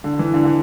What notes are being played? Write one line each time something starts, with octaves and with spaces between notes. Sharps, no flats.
D3
E3
D3
D3